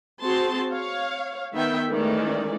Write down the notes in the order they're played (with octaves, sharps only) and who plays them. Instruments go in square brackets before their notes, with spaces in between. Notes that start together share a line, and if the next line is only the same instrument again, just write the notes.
[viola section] C4 F#4 G#4 A5 C6
C#5 F5
D#3 B3 E5 G5
D#3 E3 G#3 A3 C#4 D5